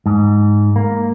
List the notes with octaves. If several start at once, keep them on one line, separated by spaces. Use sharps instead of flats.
G#2
A#3